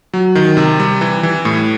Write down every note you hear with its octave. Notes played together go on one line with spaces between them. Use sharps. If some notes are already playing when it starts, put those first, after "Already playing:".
F#3
D#3
C3
G3
E3
E3
A2